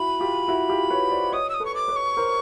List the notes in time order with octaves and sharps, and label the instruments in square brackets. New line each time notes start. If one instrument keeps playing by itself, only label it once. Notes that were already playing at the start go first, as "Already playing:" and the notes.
Already playing: [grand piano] E4 F#4 [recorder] B5
[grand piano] F4 G4
E4 F#4
F4 G4
B4 C#5
C5 D5
[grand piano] C#5 D#5 [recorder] D#6
[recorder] E6
D#6
[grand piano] A4 B4
[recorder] C#6
D6
[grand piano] B4 C#5
[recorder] C#6
[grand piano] A#4 C5